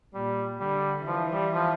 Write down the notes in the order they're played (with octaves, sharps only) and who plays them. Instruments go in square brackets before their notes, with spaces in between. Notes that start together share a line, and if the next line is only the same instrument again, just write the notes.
[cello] A#2 [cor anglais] G3
[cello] D3 [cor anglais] G3
[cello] E3 [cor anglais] F3
[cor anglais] G3
F3